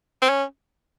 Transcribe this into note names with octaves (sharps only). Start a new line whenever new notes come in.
C4
C#4